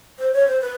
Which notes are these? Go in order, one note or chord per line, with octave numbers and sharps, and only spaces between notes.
C5
C#5
C5
B4